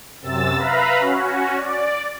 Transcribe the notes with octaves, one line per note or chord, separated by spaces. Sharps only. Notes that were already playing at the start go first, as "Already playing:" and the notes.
F#2 C3 E6 A6
B4 E5 F5 A#5 B5
C#4 F#4
D5